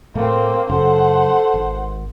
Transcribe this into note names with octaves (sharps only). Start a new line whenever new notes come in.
A2 A3 A#3 C4
F#2 C#3 A4 C5 F#5
G#1